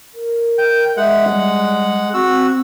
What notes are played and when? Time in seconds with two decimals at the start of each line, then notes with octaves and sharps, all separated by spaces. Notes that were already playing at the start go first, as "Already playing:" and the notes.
0.14 A#4
0.58 G5
0.97 G#3 E5 F#5
1.29 G3
2.14 C4 F#4 E6